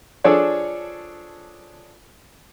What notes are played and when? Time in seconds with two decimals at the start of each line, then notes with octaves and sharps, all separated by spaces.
0.24 F3 D4 G#4 A4 C#5 D5